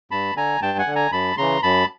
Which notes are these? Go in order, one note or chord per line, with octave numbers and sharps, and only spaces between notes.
G2 A5 B5
D3 G#5 A#5
G2 G5 A5
F#5 G#5
D3
G#5 A#5
F#2 A5 B5
C#3 E3 A#5 C6
F#2 A5 B5